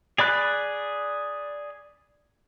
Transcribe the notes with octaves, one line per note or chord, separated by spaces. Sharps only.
G#4 D5 B5 F#6